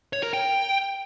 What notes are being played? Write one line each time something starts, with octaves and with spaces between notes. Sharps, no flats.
C#5
A#4
G5